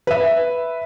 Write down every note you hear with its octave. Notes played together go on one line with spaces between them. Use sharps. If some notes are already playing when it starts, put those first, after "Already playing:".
B4 E5